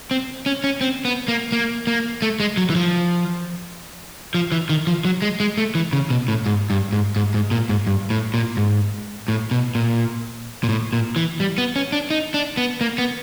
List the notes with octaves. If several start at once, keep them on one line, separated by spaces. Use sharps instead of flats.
C4
C#4
C#4
C4
B3
A#3
A#3
A#3
A3
G#3
F#3
E3
F3
F3
E3
D#3
F3
F#3
G#3
G#3
A3
E3
C#3
B2
A2
G#2
G2
G#2
G#2
G#2
A#2
G#2
G2
A2
A#2
G#2
A2
B2
A#2
A#2
A2
A#2
E3
G3
B3
C#4
D4
D#4
D4
B3
A#3
B3